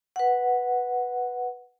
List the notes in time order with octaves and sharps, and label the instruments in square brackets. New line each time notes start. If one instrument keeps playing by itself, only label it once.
[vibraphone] B4 F#5